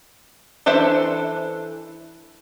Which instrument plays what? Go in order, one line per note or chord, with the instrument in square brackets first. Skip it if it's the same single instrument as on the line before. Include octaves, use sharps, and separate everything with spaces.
[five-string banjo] E3 D4 A4 C5 E5